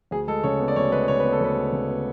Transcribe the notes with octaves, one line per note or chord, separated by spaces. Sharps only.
D2 G#4
G#3 A4
C#3 C#5
B3
D5
D2 C#5
G#3 B4
C#3 C#5
B4
B3
A4
D2 B4
G#3
C#3
B3